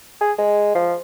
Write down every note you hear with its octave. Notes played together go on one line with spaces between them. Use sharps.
G#4
G#3
F3